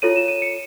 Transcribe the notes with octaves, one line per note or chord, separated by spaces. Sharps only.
F4 A4 C#5 D#7
E7
D#7
C#7